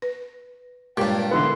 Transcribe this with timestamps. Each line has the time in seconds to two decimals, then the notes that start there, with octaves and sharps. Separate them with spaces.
0.02 B4
0.97 G2 A#2 G#3 G4 C#5 G5
1.31 D3 E3 B3 C6